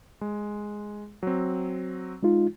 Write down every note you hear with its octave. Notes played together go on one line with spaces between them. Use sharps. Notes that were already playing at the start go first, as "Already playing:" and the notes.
G#3
F#3 C4
G#3 D#4 F4